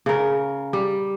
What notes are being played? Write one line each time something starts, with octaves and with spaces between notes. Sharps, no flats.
C#3 A#4
G3